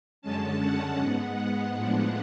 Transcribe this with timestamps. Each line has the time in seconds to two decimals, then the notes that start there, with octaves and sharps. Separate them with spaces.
0.22 F#2 D3 G#3 C#4 A5
0.60 F#5
0.99 G#2 G#3 B3
1.75 A2 F3 G#3 B3 D4